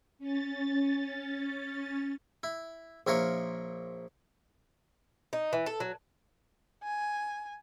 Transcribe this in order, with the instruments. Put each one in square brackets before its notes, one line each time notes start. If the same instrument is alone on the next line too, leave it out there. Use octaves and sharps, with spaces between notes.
[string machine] C#4 A6
[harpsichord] E4
A#1 E4 F4 A#4 C#5
[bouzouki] D#4
E3
A4
F#3
[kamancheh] G#5